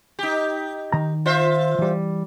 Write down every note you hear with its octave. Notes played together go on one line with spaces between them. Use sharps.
D#4 G4
D#3 A#5
F4 C5 E5
E3 G3